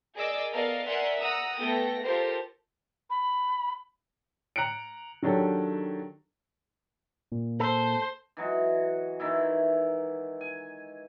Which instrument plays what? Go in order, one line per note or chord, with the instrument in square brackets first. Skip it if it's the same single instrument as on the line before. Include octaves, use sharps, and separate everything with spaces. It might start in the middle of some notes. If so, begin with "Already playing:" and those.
[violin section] G#4 A#4 D5 D#5 D6 E6
B3 A4 A#4 D5 D#5 F5
A#4 D5 E5 F#5 G#5 C6
F#5 A#5 D#6 E6
A3 B3 A4 G5 A#6
F4 G4 A4 A#4 C5
[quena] B5
[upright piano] A#5 F#6 C#7 D7
D#3 F#3 D4 G4 A4
[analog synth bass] A#2
[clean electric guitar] A4 [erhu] C5
[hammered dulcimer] E3 F#3 G#3
D#3 E3 E4
G#5